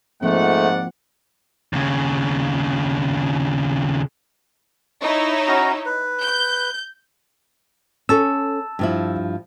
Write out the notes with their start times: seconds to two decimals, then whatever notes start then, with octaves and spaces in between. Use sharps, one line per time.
0.23 G#2 F3 A3 A#3 C4 F#4 D5 F#5
1.73 D#2 C#3
5.02 D#4 E4 C#5 C#6
5.47 C#4 F#4 A#5
5.86 B4
6.21 G6
8.09 C#4 A4 A5 E6
8.79 G2 F3 E4